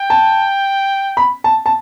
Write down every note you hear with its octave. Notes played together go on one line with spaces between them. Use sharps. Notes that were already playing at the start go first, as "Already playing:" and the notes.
Already playing: G5
A5
B5
A5
A5